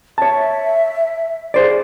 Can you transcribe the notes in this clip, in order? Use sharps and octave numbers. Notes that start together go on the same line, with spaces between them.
C#5 E5 A5
G#4 C5 D5